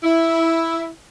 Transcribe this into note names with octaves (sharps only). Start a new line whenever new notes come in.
E4